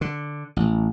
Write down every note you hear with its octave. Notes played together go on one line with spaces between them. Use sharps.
D3
A1